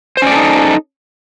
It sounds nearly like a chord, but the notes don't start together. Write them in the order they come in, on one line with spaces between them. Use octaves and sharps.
C5 C#4 D5 A4 D#4